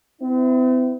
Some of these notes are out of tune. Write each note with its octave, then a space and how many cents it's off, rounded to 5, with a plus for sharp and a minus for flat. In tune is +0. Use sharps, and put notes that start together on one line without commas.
C4 -45 E4 +0